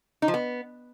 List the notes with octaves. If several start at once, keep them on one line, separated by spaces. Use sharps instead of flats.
D#4
F3
B3